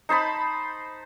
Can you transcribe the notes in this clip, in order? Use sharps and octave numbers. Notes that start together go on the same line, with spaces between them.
D#4 C5 A5 B5